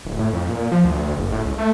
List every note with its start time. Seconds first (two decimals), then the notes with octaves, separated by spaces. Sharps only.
0.05 D1
0.19 A2
0.33 F2
0.49 A#2
0.72 F3
0.85 D2
1.02 D2
1.18 F#1
1.32 A2
1.45 C#2
1.58 A3